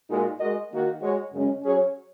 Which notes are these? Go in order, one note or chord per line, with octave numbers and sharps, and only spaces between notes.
A#2 G#3 D#4 F#4 A#4
G#3 F#4 A#4 D#5
D#3 A#3 F#4
G#3 F#4 C#5
F#2 C#3 G#3 C#4
F#3 C#4 G#4 C#5